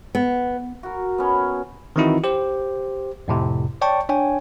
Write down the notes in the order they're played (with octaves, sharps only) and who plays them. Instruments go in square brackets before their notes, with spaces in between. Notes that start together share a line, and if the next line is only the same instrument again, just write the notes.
[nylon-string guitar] B3
[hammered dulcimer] F#4 A#4
B3 C#4
[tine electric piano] D#3 E3 C4 D#4 E4 F#4
G4 C5
F2 A2 C3
C#5 D5 G5 A5 C#6
D4 C#5 G5 G#5